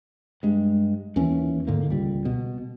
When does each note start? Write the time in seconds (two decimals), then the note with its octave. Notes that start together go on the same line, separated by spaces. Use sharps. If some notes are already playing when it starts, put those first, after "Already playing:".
0.43 G2 G#3
1.16 D#2 E3 C#4
1.67 G#2 D3 D#3 A#3
1.90 C#2 G3
2.25 B2